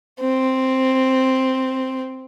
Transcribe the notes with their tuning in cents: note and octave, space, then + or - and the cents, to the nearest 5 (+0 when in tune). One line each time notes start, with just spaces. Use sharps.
C4 +0